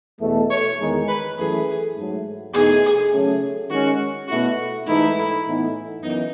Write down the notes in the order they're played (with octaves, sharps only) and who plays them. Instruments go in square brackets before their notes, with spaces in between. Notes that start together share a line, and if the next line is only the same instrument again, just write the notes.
[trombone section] E2 B2 A3
[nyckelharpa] C#5
[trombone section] E2 D#3 G#3 D#4
[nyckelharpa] B4
[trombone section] F#2 E3 A3 [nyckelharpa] G#4
[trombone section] G#2 F#3 A3
[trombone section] E2 B2 A3 D#4 [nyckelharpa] G#4
[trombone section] C#3 F#3 A3 C#4
[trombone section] D#3 G#3 C#4 [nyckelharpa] F#4
[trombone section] B2 A3 E4 [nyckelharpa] F#4
[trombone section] G#2 E3 A3 D#4 [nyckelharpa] E4
[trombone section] A2 E3 B3 D#4
[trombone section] F#2 E3 B3 [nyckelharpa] D#4